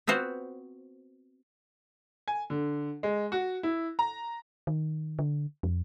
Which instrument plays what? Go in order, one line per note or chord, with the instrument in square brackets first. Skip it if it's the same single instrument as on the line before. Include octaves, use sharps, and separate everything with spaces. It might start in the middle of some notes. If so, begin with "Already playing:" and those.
[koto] B3 C4 F4 F#4 C5
[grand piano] G#5
D3
G#3
F#4
E4
A#5
[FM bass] D#3
D3
F2